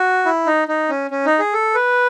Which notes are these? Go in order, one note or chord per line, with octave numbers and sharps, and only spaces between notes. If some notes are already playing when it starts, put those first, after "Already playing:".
Already playing: F#4
E4
D#4
D#4
C#4
C#4
D#4
G#4
A4
B4